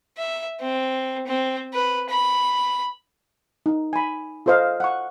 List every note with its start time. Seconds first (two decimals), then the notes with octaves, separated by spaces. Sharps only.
0.18 E5
0.61 C4
1.27 C4
1.74 B4
2.11 B5
3.66 D#4
3.93 G#5 B5
4.46 F4 A4 C5 D#5 F5
4.80 F#5 C#6